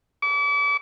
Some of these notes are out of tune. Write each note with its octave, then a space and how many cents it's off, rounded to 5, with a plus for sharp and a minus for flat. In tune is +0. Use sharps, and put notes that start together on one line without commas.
D6 -40